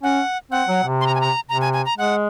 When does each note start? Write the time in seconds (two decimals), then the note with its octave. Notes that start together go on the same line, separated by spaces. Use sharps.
0.03 C#4 F#5
0.51 C4 F#5
0.68 F#3
0.84 C3
1.01 C6
1.07 A#5
1.15 G#5
1.21 A#5
1.49 C3 A#5
1.61 G#5
1.73 G#5
1.85 A#5
1.98 G#3 F#5